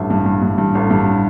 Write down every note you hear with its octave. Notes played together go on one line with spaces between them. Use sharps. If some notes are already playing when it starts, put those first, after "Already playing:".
Already playing: A1 G2 E5
G2
G2
G2
G2
A1
G2